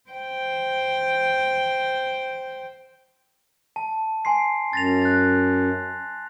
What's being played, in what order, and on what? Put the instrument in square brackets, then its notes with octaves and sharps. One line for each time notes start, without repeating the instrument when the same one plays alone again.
[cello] C5 G5
[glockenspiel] A5
G#5 C6 C7
[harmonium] F#2 [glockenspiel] A6 A#6 F7
[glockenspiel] F#6 A6